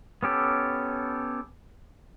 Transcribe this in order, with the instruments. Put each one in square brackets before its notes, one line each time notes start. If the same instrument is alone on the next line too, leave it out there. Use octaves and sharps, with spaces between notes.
[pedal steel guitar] B3 C#4 G4 A4